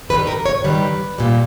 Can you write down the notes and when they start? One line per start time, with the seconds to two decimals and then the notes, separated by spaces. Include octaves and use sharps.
0.09 G2 D#3 G3 B4
0.27 A#4
0.46 C#5
0.64 G2 D#3 G3 B4
1.18 A#2 G3